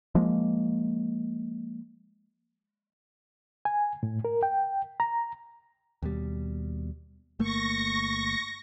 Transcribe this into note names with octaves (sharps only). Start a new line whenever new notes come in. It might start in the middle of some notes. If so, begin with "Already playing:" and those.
F3 G#3 A#3
G#5
A2
A#4
G5
A#5
D#2 B2 G3
G1 A3 A#3 C#6 A#6